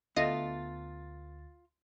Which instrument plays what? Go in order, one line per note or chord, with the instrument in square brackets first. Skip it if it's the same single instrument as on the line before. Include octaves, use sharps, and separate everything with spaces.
[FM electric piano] D2 A6 [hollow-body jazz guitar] B3 A4 E5 [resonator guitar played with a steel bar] F4 [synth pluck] D#5